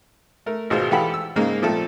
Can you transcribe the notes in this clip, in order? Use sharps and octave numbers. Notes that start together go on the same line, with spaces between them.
A3 A#4
G#1 B2 G#3 F4 C5
E3 G4 A4 F5 F#5 B5
E6
G#2 C#3 G#3 A#3 D#4
A#2 F3 A3 C4 A4